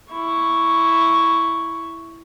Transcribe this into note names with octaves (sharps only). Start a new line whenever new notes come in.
E4 C#6